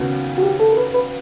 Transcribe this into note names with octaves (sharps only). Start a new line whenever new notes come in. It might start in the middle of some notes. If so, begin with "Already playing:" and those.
Already playing: D#2 C#3 F#3 B3
F#4
G4
A4
A#4
B4
B4